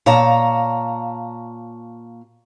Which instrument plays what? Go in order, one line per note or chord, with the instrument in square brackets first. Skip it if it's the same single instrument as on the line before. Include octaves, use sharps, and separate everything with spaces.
[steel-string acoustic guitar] A#2 C#5 F5 A5 A#5